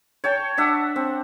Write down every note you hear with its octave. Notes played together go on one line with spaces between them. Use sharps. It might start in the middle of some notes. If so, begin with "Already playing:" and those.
C#5 G5 A5
D4 E5 F#5
C4